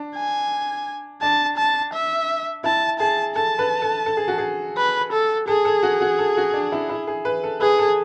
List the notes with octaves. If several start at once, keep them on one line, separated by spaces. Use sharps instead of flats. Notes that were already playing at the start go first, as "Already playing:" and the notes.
Already playing: D4
G#5
D4 A5
A5
E5
E4 A5
G#4 A5
A4 A5
B4
A4
A4
G#4
F#4
G#4
B4
A4
G#4 A4
A4
F#4
F#4
A4
F#4
D4
E4
E4
G#4
B4
A4
G#4 B4
A4